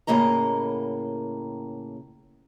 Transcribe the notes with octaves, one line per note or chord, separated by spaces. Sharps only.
A2 C#3 A#3 D#5 A#5